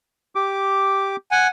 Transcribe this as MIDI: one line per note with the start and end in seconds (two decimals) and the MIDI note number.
0.35 1.16 67
0.35 1.16 86
1.31 1.47 78
1.31 1.47 80